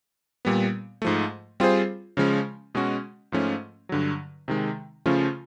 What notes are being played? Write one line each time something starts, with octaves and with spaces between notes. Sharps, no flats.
A#2 G3 B3
G#2 F3 A3
G3 C4 F4 G#4 C5
C#3 F3 G#3 C#4
B2 G#3 C#4 F#4
G#2 F3 A3 C#4
G2 D3 F#3
C3 D#3 G#3
C#3 F3 A3 C#4 F4